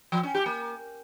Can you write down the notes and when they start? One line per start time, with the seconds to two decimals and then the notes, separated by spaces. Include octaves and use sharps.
0.12 F3
0.23 C#4
0.35 G4
0.46 A#3